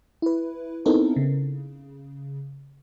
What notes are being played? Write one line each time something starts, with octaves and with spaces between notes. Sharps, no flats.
E4 B4
B3 C4 D#4 E4 A4 A#4
C#3